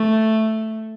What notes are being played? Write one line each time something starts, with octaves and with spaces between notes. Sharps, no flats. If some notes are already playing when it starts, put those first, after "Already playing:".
Already playing: A3